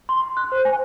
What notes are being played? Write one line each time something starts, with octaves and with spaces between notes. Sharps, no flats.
C6
F#6
C5
G#5